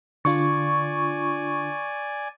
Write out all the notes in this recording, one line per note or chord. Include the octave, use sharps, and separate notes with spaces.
D3 D4 F4 D5 G#5 C#6